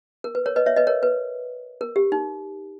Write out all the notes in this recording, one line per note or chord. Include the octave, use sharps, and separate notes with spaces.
A#4
B4
A#4 C#5
B4 D#5
C#5 E5
B4 D#5
A#4 C#5
B4
A#4
G4
D#4